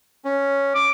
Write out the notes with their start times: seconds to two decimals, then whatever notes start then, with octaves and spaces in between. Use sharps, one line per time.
0.25 C#4
0.75 D6